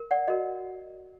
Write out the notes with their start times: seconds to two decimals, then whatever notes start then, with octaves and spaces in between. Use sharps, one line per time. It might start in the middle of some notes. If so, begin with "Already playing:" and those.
Already playing: A#4
0.11 D5 F#5
0.28 F#4 A#4 D#5